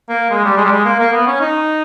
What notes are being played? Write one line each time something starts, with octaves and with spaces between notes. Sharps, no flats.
A#3
G#3
G3
G#3
G3
G#3
A#3
A#3
B3
C#4
D#4